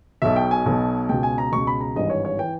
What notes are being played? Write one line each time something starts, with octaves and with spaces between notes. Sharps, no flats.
B1 B2 E5
G5
G#5
B1 B2
C#2 B2 G5
G#5
A#5
C#2 B2 C#6
B5
A#5
G#1 G2 E3 D#5
C#5
C#5
E3 G5